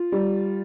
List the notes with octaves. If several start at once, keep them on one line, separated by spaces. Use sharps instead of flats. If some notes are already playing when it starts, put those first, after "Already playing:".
Already playing: F4
G3